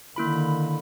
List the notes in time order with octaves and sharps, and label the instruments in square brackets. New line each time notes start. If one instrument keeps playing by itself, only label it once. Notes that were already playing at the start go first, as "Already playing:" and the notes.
[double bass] D3 D#3 [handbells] A#3 E4 B5